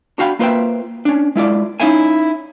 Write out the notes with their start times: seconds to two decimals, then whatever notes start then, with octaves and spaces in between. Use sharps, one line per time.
0.18 D4 F#4 F5 G5 B5
0.39 A#3 F4 B4 C5 E5 G5
1.05 C#4 D4
1.36 G#3 E4 F4 D5
1.80 C#4 D#4 E4 E5 F5 G#5